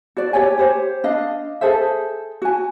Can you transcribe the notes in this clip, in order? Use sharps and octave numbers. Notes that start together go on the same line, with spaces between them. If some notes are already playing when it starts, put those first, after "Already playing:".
F#4 D5
G4 C#5 D5 G#5
G4 C5 C#5
D4 D#5 F5
G#4 A4 C5 E5
F#4 G#5